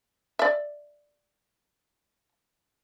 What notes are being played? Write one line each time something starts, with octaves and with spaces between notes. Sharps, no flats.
D5 E5